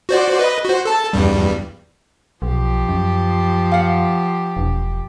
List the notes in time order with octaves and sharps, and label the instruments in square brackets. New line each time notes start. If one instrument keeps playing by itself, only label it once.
[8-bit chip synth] F#4 C5 D5
B4 D#5
F#4 C5
A4 A5
E2 G2 G3
[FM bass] B1 [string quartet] F3 G4
[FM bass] F#2
[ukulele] F5 F#5
[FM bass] E1